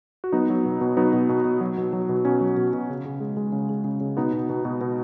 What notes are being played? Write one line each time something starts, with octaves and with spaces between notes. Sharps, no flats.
F#4
F#3 B3 D#4
F#3
B2
B2
F#3 B3 D#4
B2
B2
B2
F#3
B2
F#3
B2
B2 C#4
F#3
B2
B2
C#3
C#3
G#3
G#3
C#3
G#3
C#3
C#3
B2 B3 D#4
B2
B2
B2
B2